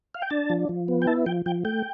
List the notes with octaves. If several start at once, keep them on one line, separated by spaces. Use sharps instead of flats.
F5
G5
D4 A5
F3
F3
B3
G5
E4 A5
F3 G5
F3 G5
A3 G5